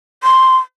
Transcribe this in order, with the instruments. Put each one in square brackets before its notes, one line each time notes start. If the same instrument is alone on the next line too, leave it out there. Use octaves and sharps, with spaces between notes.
[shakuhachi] C6